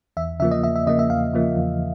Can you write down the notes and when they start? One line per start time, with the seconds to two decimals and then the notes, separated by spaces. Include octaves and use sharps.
0.17 E2 E5
0.40 C#3 F3 A#3 E5
0.51 D#5
0.63 E2 E5
0.76 E5
0.86 C#3 F3 A#3 D#5
0.99 E5
1.10 E2 F5
1.33 C#3 F3 A#3
1.56 E2